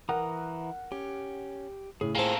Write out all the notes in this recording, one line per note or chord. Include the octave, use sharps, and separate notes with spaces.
E3 A#4 F#5 A#5 D#6
C#4 G4
A2 C#3 G#4
A#3 F4 G#4 A4 C5 G5 G#5